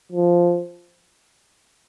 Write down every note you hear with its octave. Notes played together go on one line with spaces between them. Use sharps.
F3